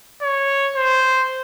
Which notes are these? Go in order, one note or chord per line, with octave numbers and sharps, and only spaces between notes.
C#5
C5